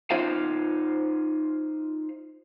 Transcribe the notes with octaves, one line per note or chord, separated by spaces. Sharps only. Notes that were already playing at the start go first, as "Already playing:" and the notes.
D#4 F4 C5 D#5 F5